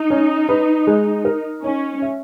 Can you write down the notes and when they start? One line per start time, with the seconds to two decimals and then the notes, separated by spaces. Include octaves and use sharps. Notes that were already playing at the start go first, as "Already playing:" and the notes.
Already playing: D#4
0.10 C#4
0.49 B4
0.87 G#3
1.25 A#4
1.64 C#4 D#4
2.02 E5